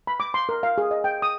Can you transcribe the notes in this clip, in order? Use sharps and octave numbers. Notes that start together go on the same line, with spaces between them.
B5
D6
C6
A#4
F5
G#4
D#5
G5
D#6